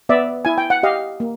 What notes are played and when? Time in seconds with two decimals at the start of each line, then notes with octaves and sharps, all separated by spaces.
0.09 B3 D5 E5
0.45 E4 G#5
0.58 G5
0.70 F#5
0.83 G4 D#5 F5
1.20 A#3